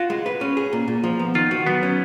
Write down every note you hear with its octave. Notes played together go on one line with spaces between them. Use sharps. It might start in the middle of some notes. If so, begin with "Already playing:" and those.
Already playing: F4 F#4
G#3
B4
C#4
G#4
A#2
A#2
F3
B3
D#3 F4
F#4
F#3 B3
C#4